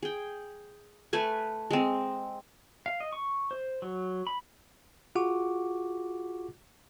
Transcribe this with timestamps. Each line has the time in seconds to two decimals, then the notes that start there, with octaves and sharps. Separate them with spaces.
0.03 G#4 G5
1.13 A3 B4 G#5
1.71 G#3 C4
2.86 F5
3.00 D#5
3.12 C#6
3.51 C5
3.82 F#3
4.27 B5
5.15 F4 F#4 G#4 F#5 C#6 D6